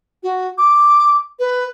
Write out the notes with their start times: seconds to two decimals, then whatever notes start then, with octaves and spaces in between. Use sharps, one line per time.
0.23 F#4
0.58 D6
1.39 B4